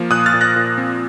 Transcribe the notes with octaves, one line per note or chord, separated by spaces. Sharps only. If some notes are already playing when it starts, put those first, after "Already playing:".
Already playing: F3 A#3
A#2 D#6 F#6
F6 A6
A#2
F#6 A#6
A#2
C4